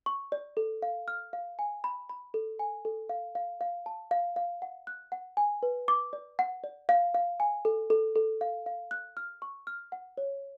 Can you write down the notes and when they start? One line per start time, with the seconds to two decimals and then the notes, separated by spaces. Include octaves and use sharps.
0.06 C#6
0.32 D5
0.57 A4
0.83 F5
1.08 F6
1.33 F5
1.59 G#5
1.84 B5
2.09 B5
2.34 A4
2.59 G#5
2.85 A4
3.09 F5
3.35 F5
3.61 F5
3.86 A5
4.11 F5
4.36 F5
4.62 F#5
4.87 F#6
5.12 F#5
5.37 G#5
5.63 B4
5.88 D6
6.13 D5
6.39 F#5
6.64 D5
6.89 F5
7.15 F5
7.40 G#5
7.65 A4
7.90 A4
8.16 A4
8.41 F5
8.66 F5
8.91 F#6
9.17 F6
9.42 C#6
9.67 F6
9.92 F#5
10.18 C#5